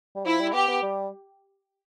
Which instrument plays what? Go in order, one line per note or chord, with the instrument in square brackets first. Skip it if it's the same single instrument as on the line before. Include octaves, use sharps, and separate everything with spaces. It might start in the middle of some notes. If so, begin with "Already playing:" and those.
[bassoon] G3
[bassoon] F3 [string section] E4
[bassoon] G3
[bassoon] B3 [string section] G4
[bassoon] B3
G3